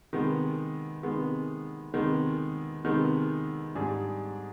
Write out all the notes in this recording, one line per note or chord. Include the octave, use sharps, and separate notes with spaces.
C3 D#3 G#3 B3
C3 D#3 G#3 B3
C3 D#3 G#3 B3
C3 D#3 G#3 B3
G#2 G3 D4 G#4